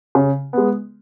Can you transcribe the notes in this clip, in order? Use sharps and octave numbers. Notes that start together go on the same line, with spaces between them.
C#3
G#3 B3